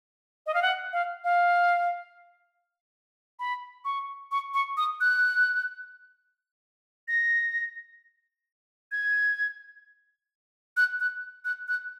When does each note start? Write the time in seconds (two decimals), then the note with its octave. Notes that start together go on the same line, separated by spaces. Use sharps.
0.46 D#5
0.54 F5
0.62 F#5
0.93 F5
1.24 F5
3.39 B5
3.85 C#6
4.31 C#6
4.54 C#6
4.77 D#6
5.01 F#6
7.08 A#6
8.92 G#6
10.77 F#6
11.00 F#6
11.45 F#6
11.68 F#6